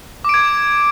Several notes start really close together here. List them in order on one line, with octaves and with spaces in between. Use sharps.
D6 D7 G#6